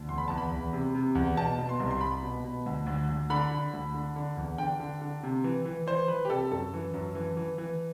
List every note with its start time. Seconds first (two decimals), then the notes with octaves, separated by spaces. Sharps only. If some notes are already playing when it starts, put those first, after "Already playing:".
Already playing: D2
0.09 E2 C6
0.18 B5
0.28 E2 A5
0.38 B5
0.51 E2
0.73 C3
0.95 C3
1.15 E2
1.37 B2 A5
1.58 B2
1.69 C6
1.80 C2
1.91 C6
2.01 C2 B5
2.23 B2
2.44 B2
2.66 D2
2.86 D2
3.09 D2
3.30 D3 B5
3.51 D3
3.73 D2
3.94 D3
4.16 D3
4.37 E2
4.58 D3 G5
4.80 D3
5.01 D3
5.23 C3
5.44 E3
5.65 E3
5.87 E3 C5
6.08 E3 B4
6.25 G4
6.30 C3 A4
6.51 F#2 A4
6.73 E3
6.94 F#2
7.15 E3
7.37 E3
7.58 E3